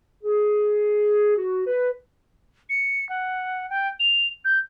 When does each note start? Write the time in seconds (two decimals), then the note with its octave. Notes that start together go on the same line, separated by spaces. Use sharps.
0.23 G#4
1.37 F#4
1.67 B4
2.69 C#7
3.09 F#5
3.70 G5
4.00 F7
4.45 G6